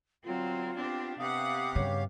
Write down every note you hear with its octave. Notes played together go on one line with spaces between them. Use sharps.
D3 F#3 B3 C4 F4
B3 C4 D4 G4
C3 B3 G4 F5 F#5 D#6
G2 C#3 C#5